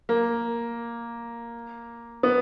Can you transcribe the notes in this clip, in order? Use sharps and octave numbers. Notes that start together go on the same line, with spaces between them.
A#3
B3